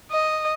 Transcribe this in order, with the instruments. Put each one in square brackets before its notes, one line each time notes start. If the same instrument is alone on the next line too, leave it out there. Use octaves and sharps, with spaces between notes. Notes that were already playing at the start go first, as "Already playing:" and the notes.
[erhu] D#5